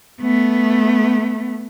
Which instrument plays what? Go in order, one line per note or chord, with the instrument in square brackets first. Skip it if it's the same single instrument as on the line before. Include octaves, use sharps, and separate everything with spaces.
[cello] A3 B3